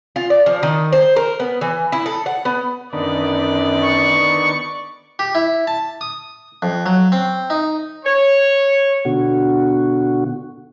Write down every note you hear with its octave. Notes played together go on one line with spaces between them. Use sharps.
F4
D5
F3
D#3
C5
A#4
B3
E3
E4
A4
F#5
B3
F#2 D3 D#3 B3 D5
C#6
G4
E4
A5
D#6
F2
F#3
C4
D#4
C#5
B2 D3 F#4